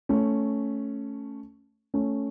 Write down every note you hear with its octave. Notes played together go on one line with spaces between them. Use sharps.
A3 C#4
A3 C#4